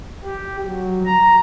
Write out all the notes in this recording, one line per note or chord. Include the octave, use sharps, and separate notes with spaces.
G4
F#3
A#5